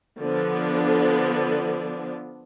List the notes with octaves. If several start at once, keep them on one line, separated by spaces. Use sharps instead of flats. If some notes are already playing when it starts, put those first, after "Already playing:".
D3 F3 B3 D4